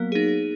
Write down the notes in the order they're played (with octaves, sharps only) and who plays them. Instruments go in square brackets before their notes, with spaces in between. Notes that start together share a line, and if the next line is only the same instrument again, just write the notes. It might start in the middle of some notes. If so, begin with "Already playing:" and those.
Already playing: [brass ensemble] F#3 A#3 [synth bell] B3
[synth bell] D#4 G#4